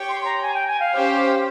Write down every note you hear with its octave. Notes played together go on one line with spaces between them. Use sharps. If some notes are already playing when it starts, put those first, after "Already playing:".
Already playing: G4 C#5 G5
C6
A#5
G#5
G5
G#5
F5
C#4 G4 C5 G5